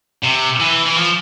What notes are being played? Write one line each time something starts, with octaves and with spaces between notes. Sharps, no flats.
C3
E3
E3
F3